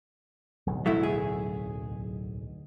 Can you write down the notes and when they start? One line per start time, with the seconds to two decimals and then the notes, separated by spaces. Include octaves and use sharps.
0.66 D1 B1 E2
0.86 F#3 A3 E4
1.03 G#4